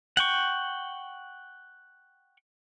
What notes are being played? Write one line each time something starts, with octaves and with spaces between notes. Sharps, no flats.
F#5 G5 C#6